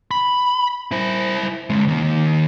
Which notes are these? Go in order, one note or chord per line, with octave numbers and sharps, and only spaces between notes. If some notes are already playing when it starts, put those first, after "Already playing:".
B5
E4 C5
D3 G#3
D#3 A#3